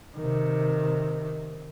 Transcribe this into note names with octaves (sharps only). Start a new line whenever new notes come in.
C3 D#3